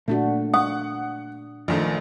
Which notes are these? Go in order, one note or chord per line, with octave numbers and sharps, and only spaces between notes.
A#2 A3 D4 F#4
F#5 C#6 D#6
A#1 D#3 F3 A3